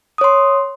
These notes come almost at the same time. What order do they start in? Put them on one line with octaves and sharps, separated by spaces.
D#6 C#5 C6